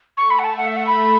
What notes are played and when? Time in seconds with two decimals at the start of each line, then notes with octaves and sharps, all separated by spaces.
0.17 A3 C#6
0.30 B5
0.39 F#5
0.44 A5
0.57 A3 F#5
0.67 E5
0.77 F#5
0.87 B5